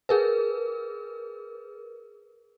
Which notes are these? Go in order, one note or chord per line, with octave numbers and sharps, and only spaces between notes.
G#4 A#4 B4